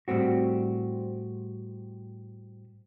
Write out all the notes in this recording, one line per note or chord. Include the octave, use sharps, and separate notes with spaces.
A2 G3 A3 C4 F#4